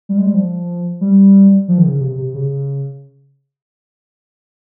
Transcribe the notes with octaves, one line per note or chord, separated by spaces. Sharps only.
G3
G#3
G3
F3
G3
F3
D#3
C#3
C#3
C3
C3
C#3